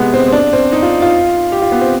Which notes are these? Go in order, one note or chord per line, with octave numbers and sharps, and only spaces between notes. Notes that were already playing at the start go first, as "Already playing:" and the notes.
Already playing: C3 G#3 B3
C4
C4
D4
C4
D#4
F4
F4
G4
F4
B3
C4